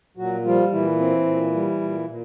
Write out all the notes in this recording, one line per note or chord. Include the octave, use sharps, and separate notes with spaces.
A#2 F#3 F#4
F3 G3 F4
A#2 E3 E4
C4
A#2
G3
A#2
A#2